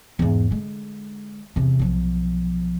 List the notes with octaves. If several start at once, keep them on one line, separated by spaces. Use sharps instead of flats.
E2 G#2
D3 G#3
E2 C3
B1 F3